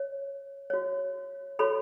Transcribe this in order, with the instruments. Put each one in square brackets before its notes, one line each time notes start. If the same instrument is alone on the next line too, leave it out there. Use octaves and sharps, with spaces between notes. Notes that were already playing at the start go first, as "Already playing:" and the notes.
Already playing: [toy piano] C#5
F#4 C#5
F#4 A4 C#5 B5